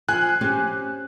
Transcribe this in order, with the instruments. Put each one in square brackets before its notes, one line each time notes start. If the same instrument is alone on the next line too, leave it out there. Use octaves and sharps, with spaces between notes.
[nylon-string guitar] F3 [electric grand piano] G#5 F#6
[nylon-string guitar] C4 C#4 G4